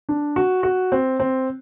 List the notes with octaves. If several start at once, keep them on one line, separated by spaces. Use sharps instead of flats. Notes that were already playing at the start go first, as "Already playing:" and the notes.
D4
F#4
F#4
C4
C4